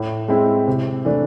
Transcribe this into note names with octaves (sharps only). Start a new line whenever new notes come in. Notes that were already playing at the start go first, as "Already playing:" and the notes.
Already playing: A2
G#3 C4 E4
C3
E3 A3 D4